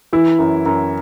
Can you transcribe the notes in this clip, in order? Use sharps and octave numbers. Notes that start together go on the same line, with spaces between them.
E3 E4
F#2
F#2